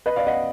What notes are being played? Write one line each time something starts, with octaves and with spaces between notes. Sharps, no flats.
B4 D#5
D5 F5
D#5 F#5